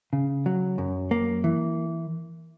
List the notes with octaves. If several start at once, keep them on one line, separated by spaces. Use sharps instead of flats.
C#3
F#3
F#2
A#3
E3